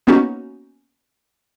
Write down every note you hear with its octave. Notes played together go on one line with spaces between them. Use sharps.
A#3 B3 C#4 D#4 F#4